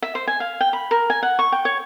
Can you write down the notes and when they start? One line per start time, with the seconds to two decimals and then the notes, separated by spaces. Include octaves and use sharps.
0.02 E5
0.15 C5
0.27 G#5
0.40 F5
0.61 G5
0.73 B5
0.91 A#4
1.10 G#5
1.23 F#5
1.39 C#6
1.52 G5
1.65 C#5